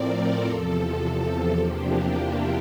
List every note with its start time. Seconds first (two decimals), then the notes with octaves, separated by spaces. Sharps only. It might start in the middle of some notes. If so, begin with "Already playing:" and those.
Already playing: A2 F3 C4 A#4 D5
0.17 A4
0.45 E2 C3 F3
1.59 E2 C3 F3 A#3 D4 G4
2.15 E4